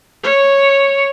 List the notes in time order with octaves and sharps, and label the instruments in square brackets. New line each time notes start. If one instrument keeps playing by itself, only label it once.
[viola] C#5